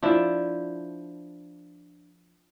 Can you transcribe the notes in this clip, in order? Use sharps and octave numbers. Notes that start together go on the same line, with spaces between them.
F3 D4 E4